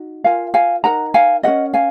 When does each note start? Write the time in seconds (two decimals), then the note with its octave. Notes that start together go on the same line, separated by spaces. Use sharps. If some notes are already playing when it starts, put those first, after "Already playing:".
Already playing: D#4 F#4
0.24 F4 A#4 F5 G#5
0.54 F5 G#5
0.84 D#4 A#4 F#5 A#5
1.14 F5 G#5
1.43 C#4 F#4 A#4 D#5 F#5
1.74 F5 G#5